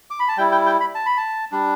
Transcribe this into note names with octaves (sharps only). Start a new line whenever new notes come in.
D6
B5
A5
G3 E4 G5
G5
G5
B5
A5
B5
A5
G3 D4